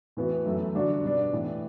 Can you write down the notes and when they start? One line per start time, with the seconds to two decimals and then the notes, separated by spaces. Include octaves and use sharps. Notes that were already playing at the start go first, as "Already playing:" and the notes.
0.17 A2 E3 B3 F#4
0.46 F#2 E3 A3
0.75 G2 D3 G3 D4 F#4
1.04 B2 G3 D4
1.33 A2 E3 B3